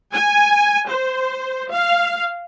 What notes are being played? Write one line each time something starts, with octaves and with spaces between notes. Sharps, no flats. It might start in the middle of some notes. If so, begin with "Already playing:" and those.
G#5
C5
F5